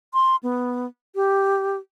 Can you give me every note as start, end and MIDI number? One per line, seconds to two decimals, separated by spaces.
0.14 0.36 84
0.43 0.86 59
1.15 1.77 67